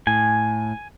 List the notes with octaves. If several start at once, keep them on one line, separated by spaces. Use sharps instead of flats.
A2 G#5